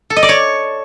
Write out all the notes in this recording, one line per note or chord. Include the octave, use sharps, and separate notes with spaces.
A4
D#5
D5
C#5